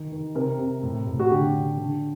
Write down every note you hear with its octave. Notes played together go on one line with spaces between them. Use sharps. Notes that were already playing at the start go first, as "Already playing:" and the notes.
Already playing: D#3
D#3
C3 A#4
C3
A2
A2
F#4
D3 G4
D3
D3